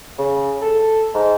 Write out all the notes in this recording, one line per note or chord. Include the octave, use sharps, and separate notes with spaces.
C#3
A4
G#2